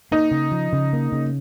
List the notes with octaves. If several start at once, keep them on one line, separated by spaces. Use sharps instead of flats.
A#3 D#4
C#3
F3
C#3
A#3
C#3